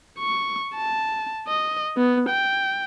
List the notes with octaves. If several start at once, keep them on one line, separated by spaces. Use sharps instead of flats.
C#6
A5
D#5
B3
G5